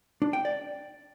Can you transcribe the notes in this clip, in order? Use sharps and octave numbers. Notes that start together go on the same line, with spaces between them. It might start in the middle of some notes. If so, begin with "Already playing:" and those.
D4
G5
D5